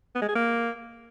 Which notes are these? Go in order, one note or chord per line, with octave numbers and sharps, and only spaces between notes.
B3
G#3
G#4
A#3